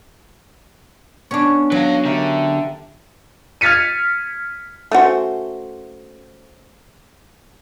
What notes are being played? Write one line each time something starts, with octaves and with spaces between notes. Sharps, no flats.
B3 C#4 D4 C#5
F#3 B4 F5
D3 G4 A#4 E5
F6 G#6 A6 B6 C#7 D#7
A3 C#4 F#4 C5